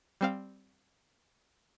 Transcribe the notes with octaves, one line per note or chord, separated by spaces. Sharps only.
G3 C4 F5